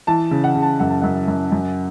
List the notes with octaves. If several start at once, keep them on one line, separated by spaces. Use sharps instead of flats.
E3 A5
C#3
F#5
C#3
A5
F#2 F#5
A5
F#2 F#5
F#2
F#2